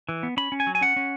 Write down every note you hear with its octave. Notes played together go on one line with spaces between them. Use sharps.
E3
B3
C#4 B5
C#4
G#5
F#3
G#5
C#4 F#5
C#4